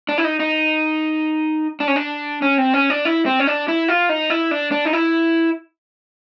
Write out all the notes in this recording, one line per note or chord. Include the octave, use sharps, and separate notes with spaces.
D4
E4
D#4
D#4
D4
C#4
D4
C#4
C4
C#4
D4
E4
C4
C#4
D4
E4
F4
D#4
E4
D4
D4
D#4
E4